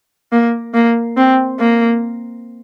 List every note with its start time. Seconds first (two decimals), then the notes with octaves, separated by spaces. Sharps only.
0.32 A#3
0.74 A#3
1.17 C4
1.59 A#3